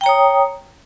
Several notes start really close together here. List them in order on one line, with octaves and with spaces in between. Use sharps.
G5 A#5 C#5 D#6